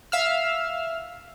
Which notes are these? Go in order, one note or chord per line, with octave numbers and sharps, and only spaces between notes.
E5 F5 E6 F6